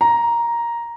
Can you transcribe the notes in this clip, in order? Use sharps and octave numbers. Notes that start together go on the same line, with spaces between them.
A#5